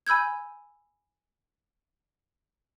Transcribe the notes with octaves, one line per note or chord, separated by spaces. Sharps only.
G#5 B5 E6 G6 G#6